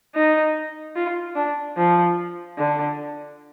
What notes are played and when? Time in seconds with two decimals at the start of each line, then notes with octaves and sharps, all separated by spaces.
0.15 D#4
0.96 F4
1.35 D4
1.77 F3
2.58 D3